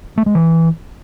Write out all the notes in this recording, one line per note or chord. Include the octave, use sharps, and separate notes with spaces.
A3
G#3
E3